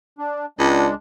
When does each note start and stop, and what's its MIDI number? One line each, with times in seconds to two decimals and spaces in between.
0.18 0.45 62
0.59 0.87 37
0.59 0.94 56
0.59 0.94 62